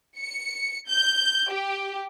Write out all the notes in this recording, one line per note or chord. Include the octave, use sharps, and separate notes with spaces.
C#7
G6
G4